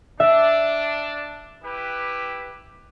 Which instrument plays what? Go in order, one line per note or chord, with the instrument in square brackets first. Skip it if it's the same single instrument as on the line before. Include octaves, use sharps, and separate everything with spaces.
[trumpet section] D4 [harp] E5
[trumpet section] E4 G4 B4